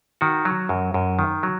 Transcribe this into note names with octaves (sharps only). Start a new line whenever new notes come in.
D#3 F#4
F#3
F#2
F#2
D#3
F#3